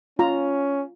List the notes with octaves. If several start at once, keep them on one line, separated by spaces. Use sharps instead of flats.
C#4 F4 A#5